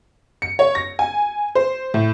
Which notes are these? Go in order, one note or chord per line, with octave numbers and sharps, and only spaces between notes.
C#7
C#5
A#6
G#5
C5
A2